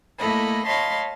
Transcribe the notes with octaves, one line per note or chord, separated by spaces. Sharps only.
A3 A#3 E4 A4 D#5 B5
C#5 D#5 F5 A5 B5 C6